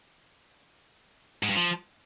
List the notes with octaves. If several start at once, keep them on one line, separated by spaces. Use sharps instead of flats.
G#2
G2
F3